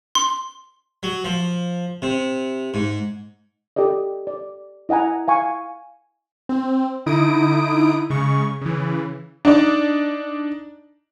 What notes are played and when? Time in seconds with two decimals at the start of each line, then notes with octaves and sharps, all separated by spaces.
0.15 C6
1.03 F#3
1.24 F3
2.02 C3
2.74 G#2
3.76 G4 A4 D5 D#5
4.27 D5
4.89 E4 D#5 F#5 G#5 A#5
5.28 F5 G#5 C#6
6.49 C4
7.06 D3 D#4 E4 D#6 D7
8.10 C#3 G#3 C#6
8.61 C#3 E3
9.45 D4 D#4 D5